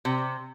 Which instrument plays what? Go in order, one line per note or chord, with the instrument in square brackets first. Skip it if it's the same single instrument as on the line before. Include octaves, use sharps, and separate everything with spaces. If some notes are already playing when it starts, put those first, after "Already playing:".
[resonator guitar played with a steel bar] C3